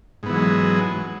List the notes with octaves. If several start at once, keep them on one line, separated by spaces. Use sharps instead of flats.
G#2 E3 F#3 G#3 B3